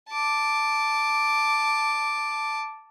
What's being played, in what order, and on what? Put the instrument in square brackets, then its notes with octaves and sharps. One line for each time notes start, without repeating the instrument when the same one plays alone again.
[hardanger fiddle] A5 D6